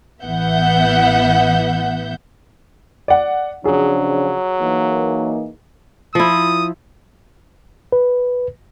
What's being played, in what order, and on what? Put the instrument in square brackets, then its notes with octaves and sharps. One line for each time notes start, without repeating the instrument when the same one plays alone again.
[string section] A1 E3 B3 E5 F#5 G6
[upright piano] D5 F#5
[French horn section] C#3 F3 D4 [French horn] F#3 [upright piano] G#4
[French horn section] E3 A#3 D#4
[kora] F3 E4 [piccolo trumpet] D#6
[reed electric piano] B4